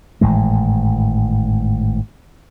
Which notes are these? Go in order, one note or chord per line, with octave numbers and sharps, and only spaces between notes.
G#1 A2 E3 G#3